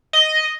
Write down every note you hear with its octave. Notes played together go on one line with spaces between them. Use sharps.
D#5